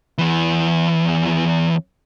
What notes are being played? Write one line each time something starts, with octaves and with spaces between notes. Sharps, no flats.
E2 E3